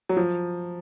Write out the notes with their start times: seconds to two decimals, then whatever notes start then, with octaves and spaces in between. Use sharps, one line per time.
0.09 F#3
0.17 F3